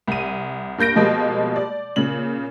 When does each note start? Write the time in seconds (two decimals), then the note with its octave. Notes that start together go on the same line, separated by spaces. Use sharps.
0.08 C2 D#7
0.78 G2 A#3 G6 A#6 D7
0.96 B2 F3 G3 G#3 A#3
1.56 D5
1.96 A#2 C#3 F#7